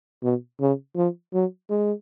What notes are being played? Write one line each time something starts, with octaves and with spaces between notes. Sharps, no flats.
B2
C#3
F3
F#3
G#3